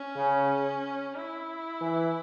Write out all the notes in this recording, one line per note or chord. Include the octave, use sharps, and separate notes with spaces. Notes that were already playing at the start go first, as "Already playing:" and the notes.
Already playing: C#4
C#3
E4
E3